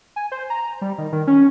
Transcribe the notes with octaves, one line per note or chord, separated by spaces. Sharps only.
G#5
C5
A#5
G3
D#3
D#3
C#4